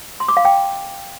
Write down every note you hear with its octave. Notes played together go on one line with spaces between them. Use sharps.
C6
D6
F5
G5